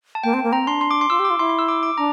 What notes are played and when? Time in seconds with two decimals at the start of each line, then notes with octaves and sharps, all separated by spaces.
0.15 A5
0.24 A#3 G5
0.34 C4
0.43 A#3
0.52 C4 A#5
0.67 D4 C6
0.81 C6
0.91 D6
1.01 C6
1.10 F4 E6
1.19 G4
1.25 D6
1.30 F4
1.39 E4 C6
1.49 C6
1.59 E6
1.68 D6
1.83 D6
1.98 D4 A#5